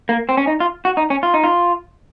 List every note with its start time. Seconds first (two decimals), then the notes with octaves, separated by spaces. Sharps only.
0.09 A#3
0.29 C4
0.37 C#4
0.47 D#4
0.60 F4
0.85 F#4
0.97 D#4
1.10 C#4
1.23 F4
1.34 D#4
1.44 F4